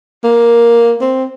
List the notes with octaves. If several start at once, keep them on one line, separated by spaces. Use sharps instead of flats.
A#3
C4